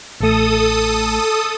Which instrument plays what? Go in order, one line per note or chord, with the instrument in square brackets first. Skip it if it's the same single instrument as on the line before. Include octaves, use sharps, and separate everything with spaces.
[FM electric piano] A1 A3 [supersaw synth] A4 D#6